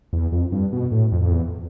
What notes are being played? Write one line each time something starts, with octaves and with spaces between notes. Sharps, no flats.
E2
F2
G2
B2
A2
F2
F2
E2